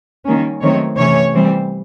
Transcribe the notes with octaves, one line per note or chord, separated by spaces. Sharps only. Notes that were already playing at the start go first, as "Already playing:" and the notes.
D#3 G3 A#3 C#4
D#3 F#3 A3 C4 C#5
C3 E3 A3 C#4 C#5
E3 G3 C4